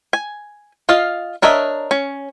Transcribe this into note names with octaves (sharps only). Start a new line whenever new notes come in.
G#5
F4 D#5 F5
D4 A#4 C#5 D#5 E5
C#4